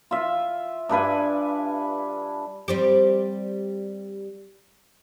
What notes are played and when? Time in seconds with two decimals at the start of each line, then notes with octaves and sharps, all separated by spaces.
0.11 F4 E5
0.89 G2 D4 B4 G#5
2.68 G3 C4 G4